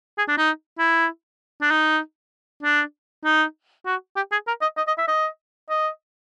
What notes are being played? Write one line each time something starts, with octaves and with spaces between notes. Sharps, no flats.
G#4
D4
D#4
E4
D4
D#4
D4
D#4
F#4
G4
G#4
A#4
D#5
D#5
D#5
E5
D#5
D#5